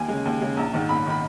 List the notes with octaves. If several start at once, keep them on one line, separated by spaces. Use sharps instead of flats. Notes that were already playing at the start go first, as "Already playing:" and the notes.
Already playing: D#2 G#5
C#3 G#3
D#2
C#3 G#3
A#1 A#5
G#2 D#3
A#1 B5
D#3 B5